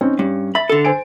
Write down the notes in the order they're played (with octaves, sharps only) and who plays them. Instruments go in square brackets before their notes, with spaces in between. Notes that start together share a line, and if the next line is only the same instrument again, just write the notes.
[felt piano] C4 C#4 D#4
[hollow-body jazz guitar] G2 [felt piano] C#4
[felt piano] E5 A6 [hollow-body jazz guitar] B5
[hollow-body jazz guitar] D3 A4
[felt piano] C5 G#5 D7